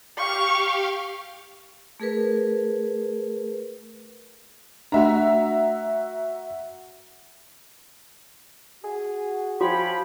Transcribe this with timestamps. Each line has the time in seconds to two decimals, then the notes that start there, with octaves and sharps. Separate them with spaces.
0.18 G4 F5 C#6
2.00 A3 G#4 A#4 B4
4.92 A3 D4 F#4 E5 A#5
8.84 F#4 G#4
9.61 F3 F#4 C#5 G5 B5